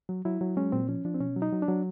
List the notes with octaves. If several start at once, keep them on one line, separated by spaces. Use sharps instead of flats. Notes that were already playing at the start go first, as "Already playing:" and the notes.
F#3
F#3 E4
F#3
G#3 C#4
A#2 C4
F3 C#4
F3 D4
C4
B2 C#4
F#3
D#4
F#3
D4
F#3